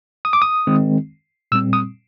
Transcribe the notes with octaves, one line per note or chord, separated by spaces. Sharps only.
D#6
D6
D#6
D#3 G#3 C4
A#2 G3 C4 E6
D#6